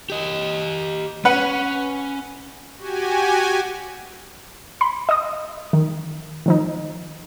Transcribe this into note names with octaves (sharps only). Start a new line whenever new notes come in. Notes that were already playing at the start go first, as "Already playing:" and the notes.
G4 D#5
C#4 B4 F#5
F#4 G4 G#5
B5 C6
D#5 D#6
D#3
D#3 F3 D#4